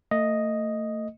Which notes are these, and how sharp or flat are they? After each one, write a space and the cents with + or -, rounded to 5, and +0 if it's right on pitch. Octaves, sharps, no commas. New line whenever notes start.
A3 +35 D#5 +0